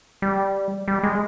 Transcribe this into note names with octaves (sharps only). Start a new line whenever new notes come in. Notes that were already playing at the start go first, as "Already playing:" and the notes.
G3
G3
G#3